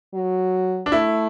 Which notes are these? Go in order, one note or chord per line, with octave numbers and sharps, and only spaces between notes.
F#3
D4
A3 E4